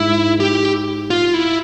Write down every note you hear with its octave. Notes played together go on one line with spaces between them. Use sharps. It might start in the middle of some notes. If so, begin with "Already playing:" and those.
Already playing: G#2 E4
G4
F4
E4